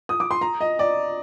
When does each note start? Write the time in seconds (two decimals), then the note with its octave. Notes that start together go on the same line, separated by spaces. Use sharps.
0.09 D#6
0.20 D6
0.31 C6
0.41 A#5
0.61 D#5
0.79 D5